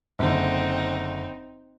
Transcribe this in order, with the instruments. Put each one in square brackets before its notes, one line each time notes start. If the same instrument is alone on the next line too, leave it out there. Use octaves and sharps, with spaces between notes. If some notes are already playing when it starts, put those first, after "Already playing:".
[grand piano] F#1 D3 [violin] C4 D#4